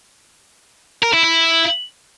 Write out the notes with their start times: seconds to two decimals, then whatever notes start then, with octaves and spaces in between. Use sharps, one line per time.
1.02 A#4
1.13 E4
1.24 E4